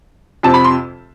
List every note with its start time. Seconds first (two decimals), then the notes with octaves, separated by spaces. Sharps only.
0.43 F2 C3 F3 C4 A5
0.54 B5
0.64 C6